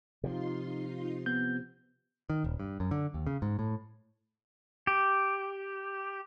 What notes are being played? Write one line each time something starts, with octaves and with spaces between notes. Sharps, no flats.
C3 F3 D#4 F4 C6
B3 G6
D#3
D#1
G2
F#2
D3
D#2
C#3
G#2
A2
G4